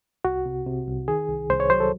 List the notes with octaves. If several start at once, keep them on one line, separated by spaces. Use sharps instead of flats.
C2 F#4
C3
C3
C2
D#3 G#4
C2
C2 C5
C#5
F#3 C5
A4